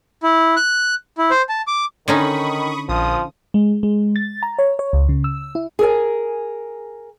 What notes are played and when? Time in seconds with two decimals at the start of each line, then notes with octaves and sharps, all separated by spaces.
0.23 E4
0.57 F#6
1.18 E4
1.31 C5
1.49 A5
1.67 D6
2.08 D3 D#3 C#4 D#4 B5 C#6 D#6
2.89 A#1 F3 D#6
3.54 G#3
3.83 G#3
4.16 A6
4.43 A#5
4.59 C#5
4.79 C#5
4.93 C#2
5.09 C#3
5.24 E6
5.55 E4
5.79 G#4 A#4 G#5